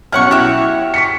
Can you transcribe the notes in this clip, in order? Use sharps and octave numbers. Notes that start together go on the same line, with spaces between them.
B1 C#4 E4 F#5 C#6 F6
E4 F#4 G4 E5
C#6 B6 C#7